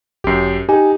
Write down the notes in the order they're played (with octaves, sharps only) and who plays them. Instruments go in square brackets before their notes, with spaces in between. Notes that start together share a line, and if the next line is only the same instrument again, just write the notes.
[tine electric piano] G1 C7 [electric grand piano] F#2 G4
[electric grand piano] D#4 [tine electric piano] G4 G#5